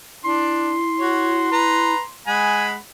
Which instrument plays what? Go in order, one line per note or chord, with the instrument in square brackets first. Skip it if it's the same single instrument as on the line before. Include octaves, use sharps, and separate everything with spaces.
[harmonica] D4 [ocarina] E4 [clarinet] C6
[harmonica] F#4 C#5
B4 A#5
[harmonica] G#3 F#5 B5 [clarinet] G#5